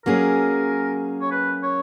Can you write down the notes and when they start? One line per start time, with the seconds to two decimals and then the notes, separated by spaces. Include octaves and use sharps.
0.05 F#3 A#3 C#4 G#4 A#4
1.21 C#5
1.31 B4
1.63 C#5